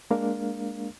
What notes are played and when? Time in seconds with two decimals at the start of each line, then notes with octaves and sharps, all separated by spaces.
0.11 G#3 A#3 D4 A#4 F5